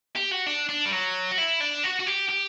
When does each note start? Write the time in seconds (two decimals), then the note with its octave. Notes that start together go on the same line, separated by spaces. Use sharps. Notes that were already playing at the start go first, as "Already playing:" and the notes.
0.16 G4
0.31 F#4
0.47 D4
0.69 D4
0.85 G3
0.93 F#3
1.31 F#4
1.38 E4
1.60 D4
1.84 F#4
2.00 F#4
2.07 G4
2.29 G4